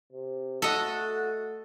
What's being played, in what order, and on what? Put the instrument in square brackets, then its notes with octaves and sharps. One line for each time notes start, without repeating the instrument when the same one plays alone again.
[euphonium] C3
[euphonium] A3 [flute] F#4 [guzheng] A4 D#5